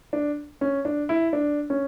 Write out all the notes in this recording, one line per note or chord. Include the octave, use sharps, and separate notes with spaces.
D4
C#4
D4
E4
D4
C#4